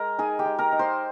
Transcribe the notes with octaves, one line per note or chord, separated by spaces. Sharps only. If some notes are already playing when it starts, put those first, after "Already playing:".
Already playing: G#3 A#4 A#5
D#4 G#4 G#5
G4 G5
G#3
A#4 A#5
D#4
C5 C6